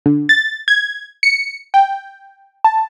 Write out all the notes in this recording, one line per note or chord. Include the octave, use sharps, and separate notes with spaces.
D3
A6
G#6
C#7
G5
A5